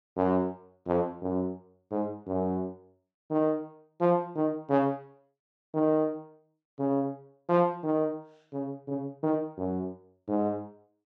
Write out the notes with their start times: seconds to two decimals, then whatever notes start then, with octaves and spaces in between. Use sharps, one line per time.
0.17 F#2
0.87 F2
1.22 F#2
1.91 G#2
2.27 F#2
3.30 D#3
4.00 F3
4.36 D#3
4.70 C#3
5.74 D#3
6.79 C#3
7.49 F3
7.83 D#3
8.53 C#3
8.88 C#3
9.23 D#3
9.58 F#2
10.28 G#2